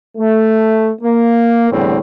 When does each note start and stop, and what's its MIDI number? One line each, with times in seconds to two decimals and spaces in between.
0.17 0.91 57
1.02 1.70 58
1.71 1.97 40
1.71 1.97 45
1.71 1.97 50
1.71 1.97 55
1.71 1.97 60